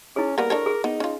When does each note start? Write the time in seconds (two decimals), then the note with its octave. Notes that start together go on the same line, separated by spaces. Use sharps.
0.16 C#4 E4 G#4
0.38 G3 A#3 B3 A#4
0.50 D4 A4 C#5
0.66 G#4
0.84 B3 D#4
1.00 C#4 F4